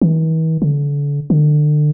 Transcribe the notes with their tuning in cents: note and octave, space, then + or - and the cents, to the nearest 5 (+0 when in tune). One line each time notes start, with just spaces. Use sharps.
E3 -45
D3 -35
D3 +30